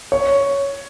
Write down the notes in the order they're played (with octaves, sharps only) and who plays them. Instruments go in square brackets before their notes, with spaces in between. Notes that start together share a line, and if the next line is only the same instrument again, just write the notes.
[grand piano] C#5